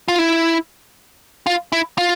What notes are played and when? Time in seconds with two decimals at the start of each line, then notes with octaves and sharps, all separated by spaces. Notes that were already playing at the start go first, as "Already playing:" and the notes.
0.08 F4
0.19 E4
1.46 F4
1.72 E4
1.98 F4